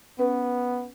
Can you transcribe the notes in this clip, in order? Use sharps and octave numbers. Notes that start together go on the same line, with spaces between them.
B3 C#4 B4